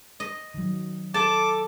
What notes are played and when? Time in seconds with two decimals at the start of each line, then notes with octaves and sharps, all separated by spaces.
0.20 D#5
0.54 D#3 F#3
1.14 A4 D5 A5 D6